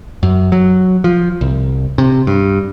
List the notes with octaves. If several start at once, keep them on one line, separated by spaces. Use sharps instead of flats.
F#2
F#3
F3
C2
C3
G2